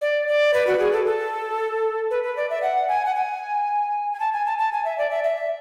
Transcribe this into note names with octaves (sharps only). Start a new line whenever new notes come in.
D5
D5
B4
F#4
G#4
A4
A4
B4
B4
D5
E5
F#5
G#5
F#5
G#5
G#5
A5
G#5
A5
A5
G#5
E5
D5
E5
E5